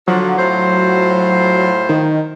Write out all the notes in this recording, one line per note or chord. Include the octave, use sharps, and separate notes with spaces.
D3 F3 F#3
A2 F4 C5
D#3